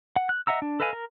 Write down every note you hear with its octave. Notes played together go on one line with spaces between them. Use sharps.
F#5
F#6
D#5 E5 F#5 A#5 E6
D4
A4 B4 D#5 F5 G#5
A#4